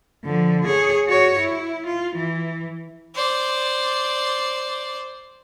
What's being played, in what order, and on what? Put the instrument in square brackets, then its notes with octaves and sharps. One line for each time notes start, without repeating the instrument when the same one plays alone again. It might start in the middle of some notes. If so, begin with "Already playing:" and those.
[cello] D3 F3
G#4 C#5
F#4 C#5
E4
F4
E3
[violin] C5 D5